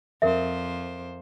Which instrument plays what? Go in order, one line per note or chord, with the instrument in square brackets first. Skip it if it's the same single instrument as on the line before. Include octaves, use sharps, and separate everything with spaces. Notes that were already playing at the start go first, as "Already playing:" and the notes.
[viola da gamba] F2 C5 [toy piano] A#4 E5